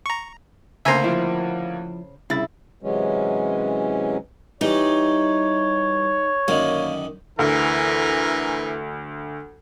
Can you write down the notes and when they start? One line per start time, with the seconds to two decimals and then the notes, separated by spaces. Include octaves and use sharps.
0.06 A#5 C#6
0.85 D2 C#3 A#3 C5 E5 G#5 A#5
1.04 F3 E4
2.30 C2 C#3 E4 A6
2.83 C3 E3 F#3 G#3 C#4
4.61 E3 G3 D#4 C#5
6.48 F#2 D3 D#3 A#3
7.39 D2 E3 A#4